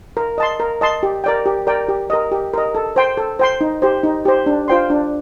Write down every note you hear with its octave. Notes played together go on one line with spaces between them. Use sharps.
A#4
D#5 A5 C6
A#4
D#5 A5 C6
G4
A#4 D5 G5
G4
A#4 D5 G5
G4
A#4 D#5
G4
A#4 D#5
A4
C5 G5 C6
A4
C5 G5 C6
D#4
G4 C5
D#4
G4 C5
D4
F4 C5 G5 C6
D4